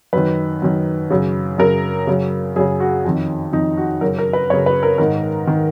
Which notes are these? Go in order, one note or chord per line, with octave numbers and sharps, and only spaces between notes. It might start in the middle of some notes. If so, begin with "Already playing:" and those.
F#2 D#3 B4
F#2 D#3
F#2 C#3
F#2 C#3 A#4
F#2 C#3
F#2 C#3 G#4
F#4
F2 D#3
F2 D#3 D#4
F#4
F#2 C#3 A#4
A#4
B4
F#2 C#3 C#5
B4
A#4
G#2 D#3 A#4
D#3